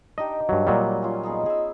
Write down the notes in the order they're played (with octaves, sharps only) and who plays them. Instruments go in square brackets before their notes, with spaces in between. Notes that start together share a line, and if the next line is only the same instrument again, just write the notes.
[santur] D4 D#4 G4 [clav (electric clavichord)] D#5
[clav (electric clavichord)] G2 F#3
[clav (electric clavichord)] A#2 F#3 G3 [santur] D#5 F#5
[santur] C#4 F4
B3 D#4 G#4
G#4 E6